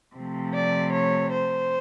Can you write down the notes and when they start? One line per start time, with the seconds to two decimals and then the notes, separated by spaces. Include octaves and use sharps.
0.15 C3 F3 A3
0.54 D5
0.92 C#5
1.30 C5